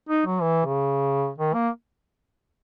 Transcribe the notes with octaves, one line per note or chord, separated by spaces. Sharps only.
D#4
F#3
E3
C#3
D#3
A#3